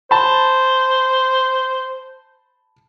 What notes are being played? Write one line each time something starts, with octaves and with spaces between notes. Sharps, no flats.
C5 A5 B5